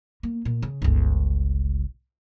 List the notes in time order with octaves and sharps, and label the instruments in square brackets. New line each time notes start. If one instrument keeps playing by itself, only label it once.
[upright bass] A#3
A#2
C#3
G1 C#2